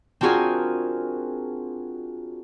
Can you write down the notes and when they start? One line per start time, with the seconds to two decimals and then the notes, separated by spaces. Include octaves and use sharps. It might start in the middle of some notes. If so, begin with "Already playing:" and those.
0.21 C4 D4 F4 F#4 G#4 A#4